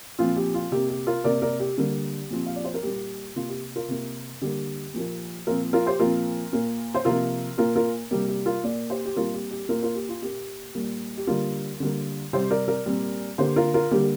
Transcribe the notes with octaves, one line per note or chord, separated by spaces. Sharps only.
A#2 F3 C4 F4
G4
F4
C3 A#3 G4
G4
F4 A#4
C3 A#3 A#4 D5
A#4 D5
G4
D3 G3 A#3 G4
A#2 F3 C4
F5
D5
C5
A#4
A#2 G3 A#3 G4
C3 A#3 F4
G4
F4 A#4
C3 A#3
D3 G3 A#3 G4
A#2 F3 A#3
A#2 F3 C4 F4 A#4
F4 A#4
G4 C5
A#2 F3 C4 F4 A#4
A#2 A#3
C5
C3 F3 A#3 F4 A#4
A#2 A#3 F4 A#4
F4 A#4
C3 G3 A#3 G4
G4
F4 A#4
A#2 A#3 A#4 D5
G4 C5
G4
A#2 G3 C4 F4 A#4
G4
G4
A#2 A#3 F4 A#4
F4 A#4
G4
F4
A#2 A#3 G4
A#2 G3 A#3
G4
D3 G3 A#3 F4 A#4
D3 G3 A#3
C3 G3 C4 G4 C5
A#4 D5
A#4 D5
A#2 G3 C4
D3 A#3 G4 C5
F4 A#4
F4 A#4
D3 G3 A#3 G4